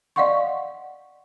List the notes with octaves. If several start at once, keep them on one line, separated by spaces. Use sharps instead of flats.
D5 D#5 F5 F#5 C6 C#6